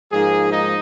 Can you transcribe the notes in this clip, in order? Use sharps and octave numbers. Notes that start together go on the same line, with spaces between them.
G#2 F3 G#3 A#3 G#4
D#4 D#5